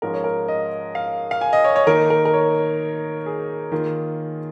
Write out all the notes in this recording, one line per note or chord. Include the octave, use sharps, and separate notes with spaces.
G#2 F3 C#4 A#4
C#5
A#4
D#5
F5
F5
G#5
D#5
C#5
C#5
D#3 A#3 D#4 A#4
A#4
A#4
C#5
G#4
D#3 A#3 F4